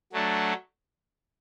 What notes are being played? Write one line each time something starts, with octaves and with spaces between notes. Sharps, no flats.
F#3 A3 D4